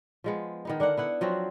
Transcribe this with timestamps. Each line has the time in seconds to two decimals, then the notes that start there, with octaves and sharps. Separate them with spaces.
0.24 F3 G#3 B3
0.65 D#3 B3 D#4
0.80 D3 D4 A#4 F#5
0.97 B3 E4 F#5
1.21 F3 F#3 C4 F#4